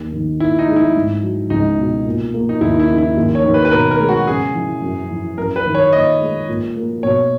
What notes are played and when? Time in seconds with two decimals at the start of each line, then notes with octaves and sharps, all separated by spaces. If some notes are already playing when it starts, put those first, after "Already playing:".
Already playing: D#2
0.13 D#3
0.40 A#2 E4
0.59 D#4
0.68 G#3
0.76 E4
0.95 G#2
1.22 F#3
1.50 C#2 D#4
1.78 B2
2.06 A#2
2.34 A#3
2.49 D#4
2.61 D#2 E4
2.80 E4
2.89 C#3
2.98 E4
3.17 D#2
3.35 C#5
3.44 D#3
3.54 B4
3.65 B4
3.71 B2 A#4
3.91 A#4
3.99 G#3
4.09 F#4
4.27 C#3 G#4
4.54 E3
4.82 F#2
5.10 E3
5.38 F#2 A#4
5.56 B4
5.66 D#3
5.75 C#5
5.93 A#2 D#5
6.21 G#3
6.48 A#2
6.76 A#3
7.03 B2 C#5